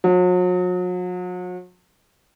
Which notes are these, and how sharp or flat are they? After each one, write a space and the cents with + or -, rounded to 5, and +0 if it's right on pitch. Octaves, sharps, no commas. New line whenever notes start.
F#3 -40